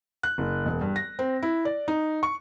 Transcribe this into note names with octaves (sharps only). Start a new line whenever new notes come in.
F#6
F#1
E1
G2
A#6
C4
E4
D5
D#4
C#6